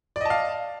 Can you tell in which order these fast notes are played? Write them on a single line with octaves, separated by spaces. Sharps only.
D5 D#5 A5 F5